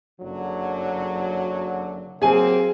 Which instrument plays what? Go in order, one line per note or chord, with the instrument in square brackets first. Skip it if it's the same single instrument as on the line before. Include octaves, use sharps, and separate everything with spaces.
[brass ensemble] F#1 D3 F#3
[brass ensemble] F#3 A#3 C4 [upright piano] G#4 G#5